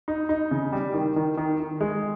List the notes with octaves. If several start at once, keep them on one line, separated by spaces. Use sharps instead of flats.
D#4
D#4
C#3
G3
D#3
D#3
D#3
D#3
G#3